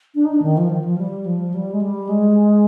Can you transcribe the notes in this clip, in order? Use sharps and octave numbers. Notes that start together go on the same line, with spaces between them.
D4
D#4
D4
D#3
F3
D#3
F3
G3
F3
G3
G#3
G3
G#3